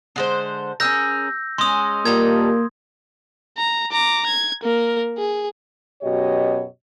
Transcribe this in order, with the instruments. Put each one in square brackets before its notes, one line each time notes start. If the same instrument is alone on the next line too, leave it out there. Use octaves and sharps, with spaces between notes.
[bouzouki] D3 G#3 C5
[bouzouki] C#4 G#4 A#4 [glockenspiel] E6 G6 A#6
[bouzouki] G#3 C#4 [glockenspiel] C6 D#6
[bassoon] A#2 [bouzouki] G3 D#4 A4 [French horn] A#3 [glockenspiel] G#6
[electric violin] A#5
A#5 D6
G#6
A#3 A#4
G#4
[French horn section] F#2 B2 F#4 G4 C#5 D#5